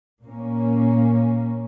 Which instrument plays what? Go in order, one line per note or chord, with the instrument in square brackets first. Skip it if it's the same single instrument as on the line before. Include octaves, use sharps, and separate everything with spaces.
[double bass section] A#2 A#3 C#4